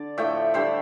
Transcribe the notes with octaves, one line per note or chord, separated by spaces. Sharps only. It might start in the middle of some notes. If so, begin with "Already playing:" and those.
Already playing: D3 D5
A2 F3 A3 E5 G5
D3 G3 C5 E5